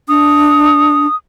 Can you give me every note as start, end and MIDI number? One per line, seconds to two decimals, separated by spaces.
0.09 1.07 62
0.09 1.15 87